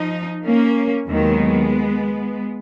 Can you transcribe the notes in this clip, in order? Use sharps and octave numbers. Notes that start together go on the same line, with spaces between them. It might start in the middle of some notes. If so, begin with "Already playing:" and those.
Already playing: F3 D#4
A#3 C#4
D#2 D#3 F#3 G#3 B3